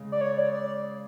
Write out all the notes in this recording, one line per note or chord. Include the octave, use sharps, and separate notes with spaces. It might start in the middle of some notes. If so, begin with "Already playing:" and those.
Already playing: C#3 G#3
D5
C#5
D5
D5